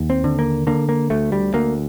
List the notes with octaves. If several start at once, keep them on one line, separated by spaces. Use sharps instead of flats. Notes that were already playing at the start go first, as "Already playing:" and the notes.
Already playing: D#2
C4
D3
A#3
D3 A#3
A#3
D2 A3
G3
D2 A#3